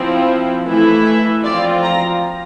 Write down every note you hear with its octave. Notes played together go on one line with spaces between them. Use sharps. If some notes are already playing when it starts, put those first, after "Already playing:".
Already playing: F3 C4 E4
E3 A3 E4
E5
F3 C4 F4 D5
A#5